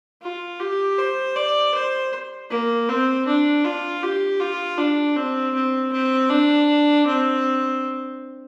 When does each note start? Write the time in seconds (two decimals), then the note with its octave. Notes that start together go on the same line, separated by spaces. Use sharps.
0.22 F4
0.60 G4
0.98 C5
1.36 D5
1.74 C5
2.50 A#3
2.88 C4
3.27 D4
3.64 F4
4.03 G4
4.40 F4
4.78 D4
5.16 C4
5.54 C4
5.92 C4
6.30 D4
7.07 C4